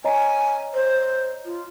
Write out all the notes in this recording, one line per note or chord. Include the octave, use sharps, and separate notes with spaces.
C#5 D#5 G#5 A#5
C5
F4